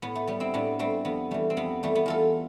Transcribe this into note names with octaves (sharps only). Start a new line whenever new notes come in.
A2 B3
A3
G3 B3
C4 E4
A2 B3 D4
G3 A3 C4
F2 B3
E3 G3 A3
C4
F2 B3
E3 G3 A3
B3
E2 F4 A4